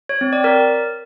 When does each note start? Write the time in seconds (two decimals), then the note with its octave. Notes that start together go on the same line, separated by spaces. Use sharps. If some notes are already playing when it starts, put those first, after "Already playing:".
0.09 C#5
0.21 C4
0.33 D5
0.44 A#4